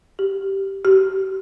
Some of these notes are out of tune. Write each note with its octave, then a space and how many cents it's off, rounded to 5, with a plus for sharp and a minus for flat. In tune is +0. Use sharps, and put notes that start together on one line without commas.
G4 -10
G4 -35